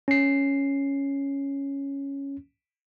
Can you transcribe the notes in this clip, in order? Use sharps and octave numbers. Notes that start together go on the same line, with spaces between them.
C#4 C7